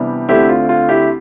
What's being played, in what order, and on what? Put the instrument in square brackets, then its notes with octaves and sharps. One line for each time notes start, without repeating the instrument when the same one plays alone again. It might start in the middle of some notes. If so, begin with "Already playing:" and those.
Already playing: [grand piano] C3 E3 G3 B3 D4
D2 D3 A3 C4 E4 G4
F4
F4
E4 G4